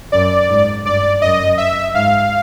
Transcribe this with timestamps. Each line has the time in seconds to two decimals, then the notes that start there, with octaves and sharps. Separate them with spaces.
0.12 F#2 D5
0.50 G#2
0.85 G2 D5
1.22 F#2 D#5
1.58 E5
1.94 G#2 F5